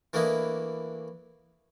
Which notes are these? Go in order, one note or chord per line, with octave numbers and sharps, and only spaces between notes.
E3 A3 A#3 D4 E4 D#5